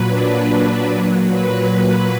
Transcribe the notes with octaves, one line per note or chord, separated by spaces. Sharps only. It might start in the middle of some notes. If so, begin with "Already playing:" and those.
Already playing: A#2 F#3 B4
D4
A#2 F#3
B4